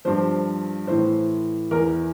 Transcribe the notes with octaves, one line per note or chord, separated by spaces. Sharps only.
G2 F3 C5
A2 E3 C5
E2 E3 A#4